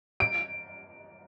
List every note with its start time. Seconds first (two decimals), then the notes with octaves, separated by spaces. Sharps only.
0.20 D7